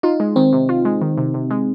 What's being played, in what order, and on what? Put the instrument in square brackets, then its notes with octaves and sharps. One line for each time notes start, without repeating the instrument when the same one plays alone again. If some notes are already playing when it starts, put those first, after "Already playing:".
[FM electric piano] D#4 [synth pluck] F4
[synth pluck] G#3
[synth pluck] D#3 [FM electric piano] C4
[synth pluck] C3
F4
G#3
D#3
C3
C3
G#3